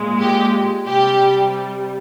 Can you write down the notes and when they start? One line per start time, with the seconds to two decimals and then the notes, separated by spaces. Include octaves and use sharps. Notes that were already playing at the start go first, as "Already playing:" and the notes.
Already playing: A#2 G#3
0.20 G4
0.87 C3 G3 G4